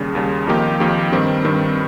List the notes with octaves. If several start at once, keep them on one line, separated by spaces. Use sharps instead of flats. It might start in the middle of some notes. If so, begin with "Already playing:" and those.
Already playing: D#2 C#3 G3
D#2 C#3 G3
F2 D#3 A#3 D#4 G4
F2 D#3 A#3 D#4 G4
G2 D#3 G3 C4
G2 D#3 G3 C4